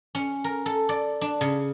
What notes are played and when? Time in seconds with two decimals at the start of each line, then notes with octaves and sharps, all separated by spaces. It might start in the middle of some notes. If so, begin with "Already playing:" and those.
0.15 C#4
0.44 A#4
0.66 A4
0.89 D5
1.21 D4
1.41 C#3